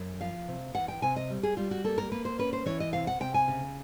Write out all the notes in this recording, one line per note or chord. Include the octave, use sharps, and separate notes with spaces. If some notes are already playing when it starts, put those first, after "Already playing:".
Already playing: F#2
F3 F5
C3
E2 F#5
G5
C3 G#5
D#5
G3
G#4
G3 F4
F#4
A#3 A4
A#4
A#3 B4
C5
C#4 B4
C5
E3 C#5
D#5
C3 F5
F#5
C3 G5
G#5
C#3